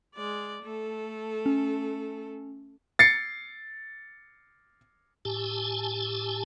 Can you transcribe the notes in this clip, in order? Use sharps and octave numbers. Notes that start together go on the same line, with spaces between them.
G#3 D5
A3 A4
C#4
A6 C7 C#7
A2 G4 G#5 A5